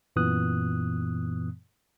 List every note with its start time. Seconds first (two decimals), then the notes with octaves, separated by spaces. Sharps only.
0.16 F#2 A#2 E3 B3 D#6 F#6